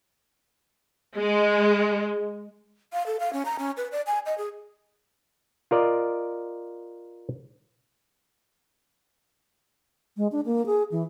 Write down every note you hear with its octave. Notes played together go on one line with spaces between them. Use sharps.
G#3
F5
A4
F5
C#4
A#5
C#4
B4
D5
G#5
D#5
G#4
F4 A#4 D5 D#5
G#3
D4
A#3
G#4
E3